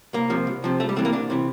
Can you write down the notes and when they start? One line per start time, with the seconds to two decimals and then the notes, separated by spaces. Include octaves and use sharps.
0.13 C2 A#3
0.30 C3 F3
0.47 C2
0.64 C3 F3
0.80 C2 A3
0.89 G3
0.96 C3 E3 A3
1.05 A#3
1.13 C2 D4
1.30 C3 E3